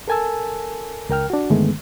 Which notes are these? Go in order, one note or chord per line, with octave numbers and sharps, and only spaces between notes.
A4 A#4 G#5 A5 E6
C#2 A#4 G5 F6
D4 F#4
G2 D3 D#3 G#3 A3 B3